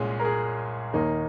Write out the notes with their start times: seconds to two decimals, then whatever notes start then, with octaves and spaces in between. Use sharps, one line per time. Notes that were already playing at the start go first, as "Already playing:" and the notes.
Already playing: C2 A#2 G#3 C#4 G#4
0.20 A#4
0.25 G#4
0.93 D#2 D#3 A#3 D#4